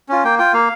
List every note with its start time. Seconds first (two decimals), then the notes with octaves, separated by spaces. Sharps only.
0.09 C#4 F4
0.24 A#3 G5
0.39 F4 G5
0.54 A#3 F5